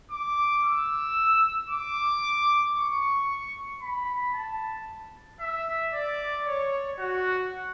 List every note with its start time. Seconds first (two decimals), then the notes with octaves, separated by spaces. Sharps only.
0.11 D6
0.63 E6
1.69 D6
2.75 C#6
3.82 B5
4.34 A5
5.41 E5
5.93 D5
6.46 C#5
6.99 F#4